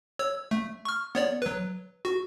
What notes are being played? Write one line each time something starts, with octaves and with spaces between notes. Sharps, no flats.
C#5 E6
A3
C#6 F6
B3 C#5 D5
F#3 B4
F#4